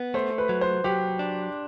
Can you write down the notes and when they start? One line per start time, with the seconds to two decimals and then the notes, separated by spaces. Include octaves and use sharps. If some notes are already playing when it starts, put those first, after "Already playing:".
Already playing: B3
0.14 A3 C5
0.38 B4
0.49 F#3
0.61 C5
0.84 F#3 G4
1.19 D4